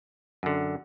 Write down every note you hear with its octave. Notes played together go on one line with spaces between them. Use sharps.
F#2 D3